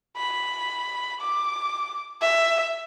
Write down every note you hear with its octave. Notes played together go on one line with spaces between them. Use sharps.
B5
D6
E5